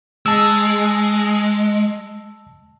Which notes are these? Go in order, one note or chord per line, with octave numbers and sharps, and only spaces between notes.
G#3 A5 E6